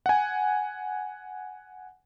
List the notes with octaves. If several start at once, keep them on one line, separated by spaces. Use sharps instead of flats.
F#5 G#5